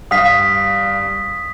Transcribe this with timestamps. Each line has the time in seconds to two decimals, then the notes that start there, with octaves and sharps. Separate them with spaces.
0.11 G2 F5 D#6 B6